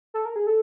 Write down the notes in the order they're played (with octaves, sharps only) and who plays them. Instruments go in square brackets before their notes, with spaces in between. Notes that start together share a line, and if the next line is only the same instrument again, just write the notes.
[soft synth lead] A4
A#4
G#4
A4